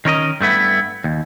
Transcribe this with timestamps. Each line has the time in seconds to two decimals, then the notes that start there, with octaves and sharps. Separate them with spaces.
0.05 D#3 C#4 A#4 D#5
0.41 G2 A3 B3 E4
1.04 D#2